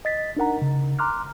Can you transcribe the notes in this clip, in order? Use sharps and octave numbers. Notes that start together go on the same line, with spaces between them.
D#5 A6 B6
D4 D#4 A#4 F#5 A#5
C#3
A#5 C6 D6 F6 F#6